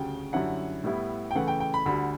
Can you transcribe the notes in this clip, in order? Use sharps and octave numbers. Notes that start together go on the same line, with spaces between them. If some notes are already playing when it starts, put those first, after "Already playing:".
Already playing: D2 C#3 G3 G5
F#2 D3 G3 C#4 E4 F#5
A2 G3 B3 E4
G5
C#3 E3 A3 F#5
G5
G5
B5
D2 D3 G3 B5